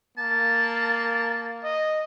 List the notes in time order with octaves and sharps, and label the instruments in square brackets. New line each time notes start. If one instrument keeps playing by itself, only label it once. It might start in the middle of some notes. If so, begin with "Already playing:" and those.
[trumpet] A#3 [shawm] A5
[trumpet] D#5